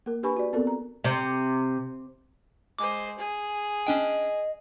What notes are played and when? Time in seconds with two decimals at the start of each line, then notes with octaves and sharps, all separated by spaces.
0.06 A#3 A#4
0.23 D4 G4 B4 G#5 B5 C#6
0.37 F#4 D5
0.53 B3 C4 F4 A4 A#4 D5
0.67 A#5
1.04 C3
2.79 G#3 C5 D6
3.18 G#4
3.87 C#4 D4 D#5 G5